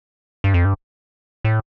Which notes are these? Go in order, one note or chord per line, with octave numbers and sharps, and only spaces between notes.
G2
F2
G2
A2